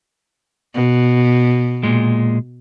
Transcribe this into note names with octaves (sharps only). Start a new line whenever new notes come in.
B2
A#2 G#3